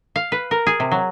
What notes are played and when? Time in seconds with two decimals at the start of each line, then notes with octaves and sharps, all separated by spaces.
0.16 F5
0.32 B4
0.51 A#4
0.67 G#4
0.80 C3
0.91 F#3